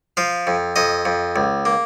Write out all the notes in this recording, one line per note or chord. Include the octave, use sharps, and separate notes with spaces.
F3 F5
F2
F2 D#5
F2
C#2
A#3